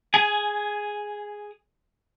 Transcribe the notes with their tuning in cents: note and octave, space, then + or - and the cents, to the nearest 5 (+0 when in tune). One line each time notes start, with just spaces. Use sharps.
G#4 +0 G#5 +20